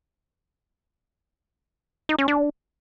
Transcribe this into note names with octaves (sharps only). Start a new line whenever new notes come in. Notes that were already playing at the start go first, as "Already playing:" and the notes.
D#4
C#4
D4